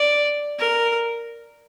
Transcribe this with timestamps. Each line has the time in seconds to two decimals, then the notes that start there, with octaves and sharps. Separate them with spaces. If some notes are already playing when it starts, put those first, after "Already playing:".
Already playing: D5
0.59 A#4